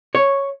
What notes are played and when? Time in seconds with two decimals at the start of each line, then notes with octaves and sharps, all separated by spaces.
0.15 C#5